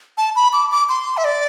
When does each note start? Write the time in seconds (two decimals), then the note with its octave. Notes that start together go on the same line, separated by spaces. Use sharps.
0.18 A5
0.36 B5
0.53 D6
0.71 D6
0.89 C6
1.17 E5
1.25 D5